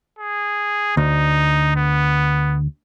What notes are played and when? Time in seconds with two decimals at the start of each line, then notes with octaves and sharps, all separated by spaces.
0.19 G#4
0.97 D2 D#4
1.76 B3